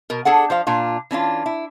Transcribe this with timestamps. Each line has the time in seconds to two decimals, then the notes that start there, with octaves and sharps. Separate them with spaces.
0.10 B2 A#4
0.25 D4 G#4 A4 F#5
0.50 F3 C5 F5
0.67 A#2 D4 F4
1.11 E3 C#4 D4 F4
1.46 E4